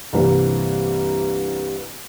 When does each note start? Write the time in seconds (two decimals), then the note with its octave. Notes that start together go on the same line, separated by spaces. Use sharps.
0.13 C2 G2 C3 E3 G3 A#3